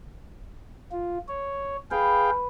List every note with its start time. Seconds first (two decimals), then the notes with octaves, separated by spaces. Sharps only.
0.92 F4
1.28 C#5
1.91 G#4 B4 F5 G5